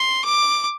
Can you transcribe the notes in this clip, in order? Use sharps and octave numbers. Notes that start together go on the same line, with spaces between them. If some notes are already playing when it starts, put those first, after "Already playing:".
Already playing: C6
D6